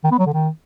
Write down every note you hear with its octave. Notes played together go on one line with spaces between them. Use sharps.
D#3
B3
F#3
D3
D#3